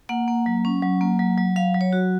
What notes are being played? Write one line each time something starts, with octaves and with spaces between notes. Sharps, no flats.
A#3 F#5
A#3
F#3
C#4
F#3
A#3
F#3
F#3
F#3 F5
F#3
C#5
F#4